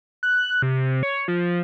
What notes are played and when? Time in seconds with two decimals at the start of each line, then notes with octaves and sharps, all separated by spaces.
0.23 F#6
0.62 C3
1.03 C#5
1.28 F3